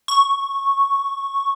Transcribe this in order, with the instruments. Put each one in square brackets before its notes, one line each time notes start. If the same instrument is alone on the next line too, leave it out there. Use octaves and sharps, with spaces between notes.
[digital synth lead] C#6